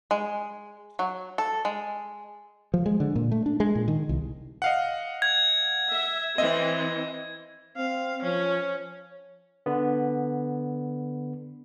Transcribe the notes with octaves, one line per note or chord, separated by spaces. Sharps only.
G#3
F#3
A4
G#3
F3
G#3
D3
A#2
A3
D4
G#3
A#2
D#3
C2
D#5 F5 F#5
G#6
E5
E3 C4 D#5 E5
C4 F5
F3 C#4
D3 B3